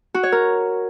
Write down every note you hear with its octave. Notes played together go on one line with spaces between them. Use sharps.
F#4
C#5
A#4